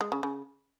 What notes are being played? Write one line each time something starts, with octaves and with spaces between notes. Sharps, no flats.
G#3
C#3
C#3